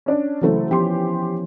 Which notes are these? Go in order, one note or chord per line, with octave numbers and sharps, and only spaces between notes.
C#4 D4 D5
C#3 E3 F#3 A3 E4 C5
F3 B3 C#4 G4 C6